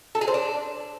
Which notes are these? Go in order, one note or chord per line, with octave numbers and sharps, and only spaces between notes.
A4
G#4
C5
D4